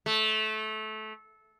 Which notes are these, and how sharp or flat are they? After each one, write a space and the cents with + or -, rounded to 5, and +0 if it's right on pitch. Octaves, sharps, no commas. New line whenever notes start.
A3 -20